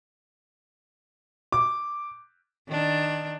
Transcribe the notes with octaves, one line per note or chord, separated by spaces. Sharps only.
D6
D#3 D4